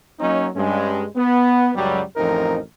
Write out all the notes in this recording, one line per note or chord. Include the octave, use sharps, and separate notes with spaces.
F#3 A#3 C#4 D#4
G2 G#3 C#4
B3
C#2 F#2 F#3 G3
A1 F2 F3 C4 D#4 A#4